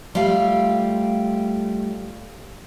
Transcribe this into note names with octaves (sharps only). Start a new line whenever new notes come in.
G3 A3 F4 F5 G5